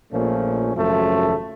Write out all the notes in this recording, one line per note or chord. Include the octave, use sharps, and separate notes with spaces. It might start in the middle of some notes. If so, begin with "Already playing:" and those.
A#1 A#2 F3 A3 C#4
G#1 F#2 C#3 F3 A3